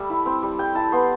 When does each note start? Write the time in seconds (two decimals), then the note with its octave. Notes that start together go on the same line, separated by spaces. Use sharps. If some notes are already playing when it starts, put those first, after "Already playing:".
Already playing: G3 A3 E5
0.10 E4
0.26 C4
0.43 G3
0.59 G3 G5
0.75 E4 A5
0.92 B3 C6